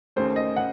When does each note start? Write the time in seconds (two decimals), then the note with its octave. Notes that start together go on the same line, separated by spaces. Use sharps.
0.16 D#2 C#3 A3 C5
0.36 D#5
0.56 C#3 F#5